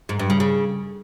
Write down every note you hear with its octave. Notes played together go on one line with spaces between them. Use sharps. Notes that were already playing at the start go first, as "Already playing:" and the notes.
G#2
G2
C#3
C#3